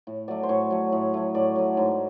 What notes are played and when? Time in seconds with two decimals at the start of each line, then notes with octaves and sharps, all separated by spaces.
0.07 A2
0.28 F#3 A3 D5
0.43 C5
0.49 A2 C#5
0.70 F#3 A3
0.92 A2
1.14 F#3 A3
1.35 A2 D5
1.56 F#3 A3
1.77 G#2